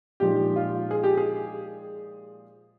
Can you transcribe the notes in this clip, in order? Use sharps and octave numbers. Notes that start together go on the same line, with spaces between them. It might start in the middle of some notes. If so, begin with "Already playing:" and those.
A#2 F3 G#3 D#4 G4
F4
G#4
G4
G#4